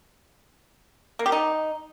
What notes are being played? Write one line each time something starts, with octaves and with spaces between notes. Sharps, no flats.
A#3
G4
D#4